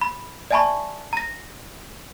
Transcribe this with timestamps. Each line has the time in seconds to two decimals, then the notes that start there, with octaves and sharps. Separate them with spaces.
0.01 B5
0.51 D5 E5 G#5 A5 B5 C#6
1.13 A#5 A#6